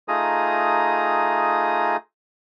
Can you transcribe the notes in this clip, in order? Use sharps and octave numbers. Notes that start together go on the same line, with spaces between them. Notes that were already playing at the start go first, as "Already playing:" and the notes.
A3 D#4 F4 G#4 A#5 D#6